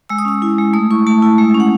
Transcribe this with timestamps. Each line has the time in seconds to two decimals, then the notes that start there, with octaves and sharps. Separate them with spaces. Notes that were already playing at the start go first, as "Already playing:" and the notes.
0.09 G#3 E6
0.18 D#6
0.25 C#4 E6
0.42 E4
0.58 G#3
0.73 A3 D#6
0.91 E4 C#6
1.07 A3 A5
1.22 E4
1.38 G#3
1.55 C#4
1.60 F#5